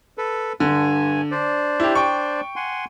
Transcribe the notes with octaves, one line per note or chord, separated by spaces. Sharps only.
A4 B4
G2 D3 G#5
D4 C5 D5
E4 G4
G5 C#6
F#5 G#5 C6